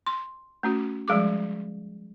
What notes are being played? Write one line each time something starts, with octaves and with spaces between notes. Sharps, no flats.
C6
A3 C#4 F#4
F3 G3 G#3 G#4 D6